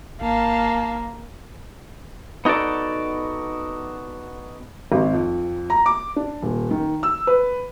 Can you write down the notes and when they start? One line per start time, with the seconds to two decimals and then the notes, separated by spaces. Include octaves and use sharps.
0.21 G#1 A#3 F5 A5
2.45 B3 D#4 F#4 A4 D5
4.92 G#1
5.13 F2
5.70 A#5
5.86 D6
6.16 D4
6.42 D#1
6.71 D#3
7.03 E6
7.27 B4